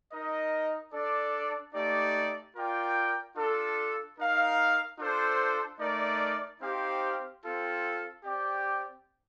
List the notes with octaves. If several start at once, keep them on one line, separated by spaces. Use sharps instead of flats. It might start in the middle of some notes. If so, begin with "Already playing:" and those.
D#4 A#4 D#5
D4 A4 D5
A3 D#4 G4 D5
F4 A#4 D5 G5
D4 F4 A4
D#4 A#4 F5
D4 F4 A4 C5
A3 D#4 A#4 D5
C4 D#4 G4 C5 F5
C4 F4 A4
C4 G4 D5 G5